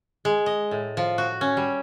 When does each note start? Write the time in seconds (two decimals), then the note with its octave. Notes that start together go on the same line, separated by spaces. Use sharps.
0.25 G#3
0.46 D#5
0.71 A2
0.97 F3
1.18 F#4
1.41 C#4
1.57 G3